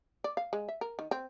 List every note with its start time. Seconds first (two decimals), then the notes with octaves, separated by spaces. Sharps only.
0.24 D5
0.37 F5
0.53 G#3
0.69 E5
0.81 A#4
0.99 D#3
1.11 C4